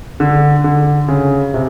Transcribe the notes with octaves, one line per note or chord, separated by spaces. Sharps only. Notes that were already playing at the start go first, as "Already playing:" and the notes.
D3
D3
C#3
C3